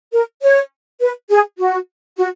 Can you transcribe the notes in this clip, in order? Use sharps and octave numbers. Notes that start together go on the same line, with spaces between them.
A#4
C#5
B4
G#4
F#4
F#4